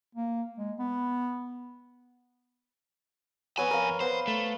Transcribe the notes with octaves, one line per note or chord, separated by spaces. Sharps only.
A#3
G#3
B3
F2 B3 C#5 G#5 E6
A#4 F5
B3 C5
A3